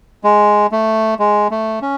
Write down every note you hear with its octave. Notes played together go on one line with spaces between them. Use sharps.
G#3
A3
G#3
A3
C#4